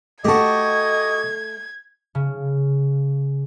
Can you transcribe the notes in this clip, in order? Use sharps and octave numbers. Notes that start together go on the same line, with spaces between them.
A3 F#4 G4 A4 D#5 G#6
C#3